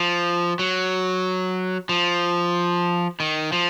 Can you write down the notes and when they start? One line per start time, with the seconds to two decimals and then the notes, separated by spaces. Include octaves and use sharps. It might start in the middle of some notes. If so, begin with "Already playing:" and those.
Already playing: F3
0.59 F#3
1.89 F3
3.20 D#3
3.52 F3